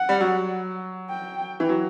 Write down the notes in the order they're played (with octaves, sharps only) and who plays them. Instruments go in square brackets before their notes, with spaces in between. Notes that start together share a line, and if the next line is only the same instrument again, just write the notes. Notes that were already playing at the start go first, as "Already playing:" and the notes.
Already playing: [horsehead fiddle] F#5
[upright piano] G3
F#3
[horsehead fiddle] G5
[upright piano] E3
F#3